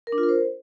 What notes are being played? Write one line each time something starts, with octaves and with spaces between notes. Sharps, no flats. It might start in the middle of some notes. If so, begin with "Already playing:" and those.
A#4
D4
F4
A#4
C5